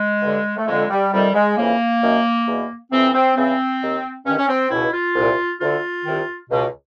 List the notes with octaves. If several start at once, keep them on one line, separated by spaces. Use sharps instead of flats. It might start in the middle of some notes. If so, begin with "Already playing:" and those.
Already playing: G#3
G2 D3
A3
F2 D3 G#3
G3
F2 C3 D#3 G3
G#3
F2 C#3 E3 A#3
F#2 D#3
E2 B2
F2 C3 E3 C4
C4
E2 C#3 E3 C4
D#2 D#3
G2 D#3 C#4
C#4
C4
C#2 B2 E4
F4
C2 A#2
D2 D3 F4
C2 C3 D#3
C#2 B2